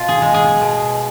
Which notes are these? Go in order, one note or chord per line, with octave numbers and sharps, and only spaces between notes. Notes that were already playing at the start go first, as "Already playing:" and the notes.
Already playing: B2 F4
G#4
G#3
G#4
B2